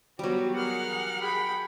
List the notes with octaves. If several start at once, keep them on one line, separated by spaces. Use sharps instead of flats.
F#3 G3 B3 F#4 G4
G4 G#4 A#4 F#5 F6
G#4 G5 B5